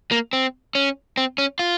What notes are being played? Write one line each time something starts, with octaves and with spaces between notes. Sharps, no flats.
A#3
C4
C#4
C4
C#4
F4